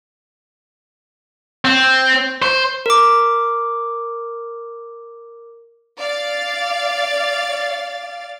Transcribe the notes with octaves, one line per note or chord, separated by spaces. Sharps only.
C4
C5
A#4 D6
D5 F5 A6